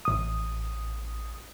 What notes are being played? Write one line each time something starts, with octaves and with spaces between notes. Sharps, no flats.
A1 D#6